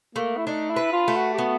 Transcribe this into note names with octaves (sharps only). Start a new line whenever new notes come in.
A3 A#3
E4
D4 D#4
E4
B4
F4
A3
F#4
G4
B3 F#4